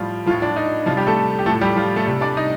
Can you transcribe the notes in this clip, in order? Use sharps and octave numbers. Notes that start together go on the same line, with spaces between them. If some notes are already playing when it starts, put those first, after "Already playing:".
Already playing: A2 F3 G3 F4
A2 F3 F4
D4
D#4
C3 F3 G3 F4
G3 G4
A3 A4
G4
A2 F3 A3 A4
G3 G4
F3 F4
A3 A4
C3 G3
D4 D5
D#4 D#5